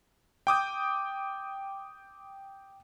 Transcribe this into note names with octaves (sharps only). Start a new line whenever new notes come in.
G5 D6 D#6 G6